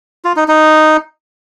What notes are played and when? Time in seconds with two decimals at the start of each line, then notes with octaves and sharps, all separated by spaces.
0.24 F4
0.36 D#4
0.48 D#4